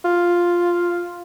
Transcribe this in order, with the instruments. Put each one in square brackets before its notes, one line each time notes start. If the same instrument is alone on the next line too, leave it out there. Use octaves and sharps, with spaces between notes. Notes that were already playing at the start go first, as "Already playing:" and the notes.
[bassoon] F4